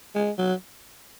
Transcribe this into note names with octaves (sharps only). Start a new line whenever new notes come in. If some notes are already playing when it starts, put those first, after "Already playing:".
G#3
F#3